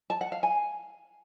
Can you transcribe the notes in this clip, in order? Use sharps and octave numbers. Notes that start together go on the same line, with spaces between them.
A5
F#5
F5
G#5